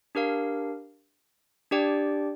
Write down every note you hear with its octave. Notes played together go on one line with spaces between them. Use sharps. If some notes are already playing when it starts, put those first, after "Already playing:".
D4 G4 A#4 F5
D4 G4 D5 G5